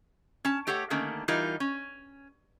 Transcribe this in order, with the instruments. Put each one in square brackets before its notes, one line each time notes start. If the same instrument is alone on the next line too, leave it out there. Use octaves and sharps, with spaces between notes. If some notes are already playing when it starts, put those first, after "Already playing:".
[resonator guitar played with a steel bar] C#4 A5
A3 G4 A4 C#5 F#5
D3 D#3 A3 A#3 C#4
E3 G3 D#4 F4 A#4
C#4